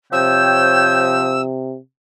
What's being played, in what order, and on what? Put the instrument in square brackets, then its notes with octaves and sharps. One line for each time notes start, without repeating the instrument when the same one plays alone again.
[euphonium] C3 [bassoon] F3 [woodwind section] C#5 G5 [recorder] E6